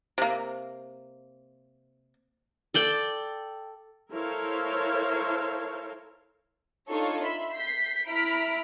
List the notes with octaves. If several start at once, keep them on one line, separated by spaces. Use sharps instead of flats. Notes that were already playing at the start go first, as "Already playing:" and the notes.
C3 A#3
A4 D5 G5
E4 A4 A#4 C5 C#5 F5
D4 D#4 F4 A4 C#5 C#6
E5 B5 C6
G6 B6 C7
E4 A#5 B5 F6 B6 D7